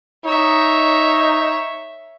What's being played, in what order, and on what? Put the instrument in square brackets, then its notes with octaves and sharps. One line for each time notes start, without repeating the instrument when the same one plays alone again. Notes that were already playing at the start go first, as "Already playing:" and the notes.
[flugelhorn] D#4 [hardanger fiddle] C#5 E5